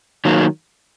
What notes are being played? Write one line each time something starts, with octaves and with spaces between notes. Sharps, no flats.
D#3 F#3 A#3